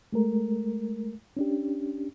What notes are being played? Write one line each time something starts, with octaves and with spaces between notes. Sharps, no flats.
G#3 A3 A#4
C#4 D4 G4